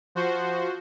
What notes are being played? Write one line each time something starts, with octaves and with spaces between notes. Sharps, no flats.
F3 F#4 C5